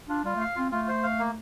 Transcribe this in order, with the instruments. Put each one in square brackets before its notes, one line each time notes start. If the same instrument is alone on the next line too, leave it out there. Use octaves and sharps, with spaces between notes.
[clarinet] D4 [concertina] F4
[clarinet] G3 [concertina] F4
[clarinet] A3
[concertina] F5
[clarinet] C4 [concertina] F4
[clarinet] A3 [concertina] F4
[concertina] C5
F5
A#3